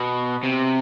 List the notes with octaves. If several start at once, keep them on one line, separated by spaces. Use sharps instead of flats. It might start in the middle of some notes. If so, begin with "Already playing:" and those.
Already playing: B2
C3